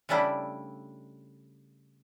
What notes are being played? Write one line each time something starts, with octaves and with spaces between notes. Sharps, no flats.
C#3 G3 A3 D4 E4